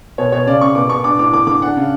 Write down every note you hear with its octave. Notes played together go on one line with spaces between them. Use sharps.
B2 C#5
B2 C#5
C#3 D5
C#3 C#6
B2 D6
B2 C#6
D4 D6
A2 D6
D3 D6
D3 D6
D4 F#5
C#3